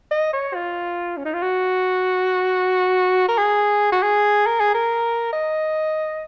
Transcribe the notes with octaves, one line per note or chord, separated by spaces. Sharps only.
D#5
C#5
F4
C#4
D#4
F4
F#4
A#4
G#4
F#4
G#4
A#4
G#4
A#4
D#5